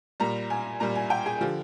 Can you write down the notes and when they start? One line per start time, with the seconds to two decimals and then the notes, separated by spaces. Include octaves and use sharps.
0.20 A#2 G3 A#5
0.50 G#5
0.80 A#2 G3 A#5
0.96 G#5
1.10 G5
1.26 G#4
1.41 D3 F3 G4